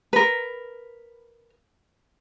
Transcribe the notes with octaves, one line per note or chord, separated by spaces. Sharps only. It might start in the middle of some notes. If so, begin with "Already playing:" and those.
A#4 B4